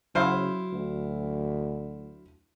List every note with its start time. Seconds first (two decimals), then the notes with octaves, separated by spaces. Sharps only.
0.15 C#3 F#3 E4 C5 F5
0.72 D2